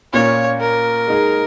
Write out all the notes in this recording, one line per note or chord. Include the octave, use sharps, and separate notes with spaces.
A#2 A#3 C#4 F4 C#5
A#4
G#3 D#4 G#4